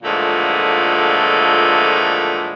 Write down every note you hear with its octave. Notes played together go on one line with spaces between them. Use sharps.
A#2 D3 E3 F3 G#3 A3